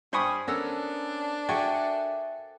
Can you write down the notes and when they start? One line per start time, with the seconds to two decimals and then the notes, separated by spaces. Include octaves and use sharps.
0.13 G2 G3 C5 G#5 B5 C#6 D#6
0.48 B3 C#4 D4 A4 A#4 E6
1.49 F#4 G#4 A4 D5 E5 G5 C#6